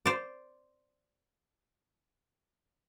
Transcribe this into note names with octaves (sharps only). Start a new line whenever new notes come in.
C5 D5